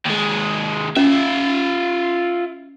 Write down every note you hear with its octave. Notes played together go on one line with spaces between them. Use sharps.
D#2 G#3
C#4 F4 E5